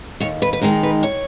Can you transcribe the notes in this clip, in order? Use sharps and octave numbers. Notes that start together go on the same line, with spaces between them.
D#2 C#5
B4
B4
D#3 G#3 D#4 A#4
B4
C#5